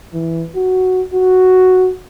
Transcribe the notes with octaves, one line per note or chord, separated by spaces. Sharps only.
E3
F#4
F#4